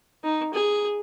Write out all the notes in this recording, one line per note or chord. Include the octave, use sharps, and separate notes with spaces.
D#4
G#4